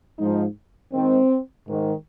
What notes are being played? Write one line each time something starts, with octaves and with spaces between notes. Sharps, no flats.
G#2 F3 D#4
G#2 D#3 C4
G#2 D#3